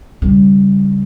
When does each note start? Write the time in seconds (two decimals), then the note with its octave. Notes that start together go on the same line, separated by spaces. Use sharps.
0.22 C#3 G3